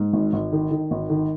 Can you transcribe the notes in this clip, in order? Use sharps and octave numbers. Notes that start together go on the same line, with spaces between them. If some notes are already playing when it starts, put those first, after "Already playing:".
Already playing: G#2
G#1
G#1
D#3
D#3
G#1
D#3